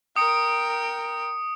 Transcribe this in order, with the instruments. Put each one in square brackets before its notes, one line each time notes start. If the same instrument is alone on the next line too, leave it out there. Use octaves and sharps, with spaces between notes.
[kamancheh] A#4 G5 [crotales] D#6 C#7 D7